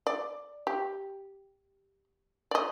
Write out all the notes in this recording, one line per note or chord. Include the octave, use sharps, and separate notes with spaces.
D5
G4
D5 D#5